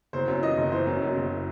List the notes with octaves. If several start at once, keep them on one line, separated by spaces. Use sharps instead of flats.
F#1 C5
F#2
E3 D#5
F#1
E3 C5
F#2
F#2
F#1